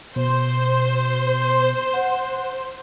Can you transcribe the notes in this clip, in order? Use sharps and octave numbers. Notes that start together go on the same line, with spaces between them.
B2 C5
F#5